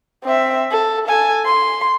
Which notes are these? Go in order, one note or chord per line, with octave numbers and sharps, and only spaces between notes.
C4 E5
A4
A4 G#5
C6